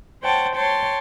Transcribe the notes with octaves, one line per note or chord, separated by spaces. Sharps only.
C5 C#5 F#5 G5 A5
C#5 G5 A5 C6